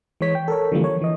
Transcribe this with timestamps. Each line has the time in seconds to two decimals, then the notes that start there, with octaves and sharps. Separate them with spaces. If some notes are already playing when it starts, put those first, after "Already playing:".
0.21 E3 G#3 C#5 B6
0.35 G5
0.48 A4 A#4 C#5
0.72 D3 E3 F3 G3 A#3
0.84 C#5
1.02 E3 D#5